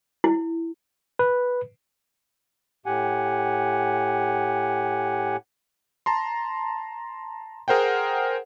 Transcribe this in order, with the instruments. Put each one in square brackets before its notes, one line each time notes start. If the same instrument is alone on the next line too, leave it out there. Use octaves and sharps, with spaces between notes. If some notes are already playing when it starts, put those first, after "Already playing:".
[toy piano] E4
[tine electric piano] B4
[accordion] A2 G4 F#5 G#5
[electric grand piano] A5 A#5 C6
G#4 A#4 C5 F#5 G5